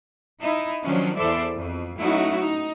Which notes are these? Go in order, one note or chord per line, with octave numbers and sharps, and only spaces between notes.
D#4 E4
D#3 F3 F#3 C#4 D4
E2 E3 A4 C5 D5 E5
F2
F#3 A3 C#4 D#4 E4 F#4
D#4